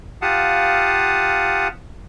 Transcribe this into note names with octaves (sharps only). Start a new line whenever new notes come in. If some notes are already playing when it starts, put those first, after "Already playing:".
F4 G4 F5 F#5 A5 D#6